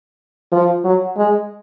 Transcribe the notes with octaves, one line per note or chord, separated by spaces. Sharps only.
F3
F#3
G#3